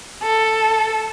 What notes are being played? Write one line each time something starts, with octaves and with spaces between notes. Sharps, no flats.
A4